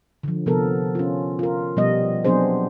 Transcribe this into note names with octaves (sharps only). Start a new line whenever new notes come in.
D3 F3
C3 F3 B3 A4 A#4
C#4 F4
F4 A#4
B2 F3 G3 B3 D#5
F#3 B3 C4 D4 G#4 C5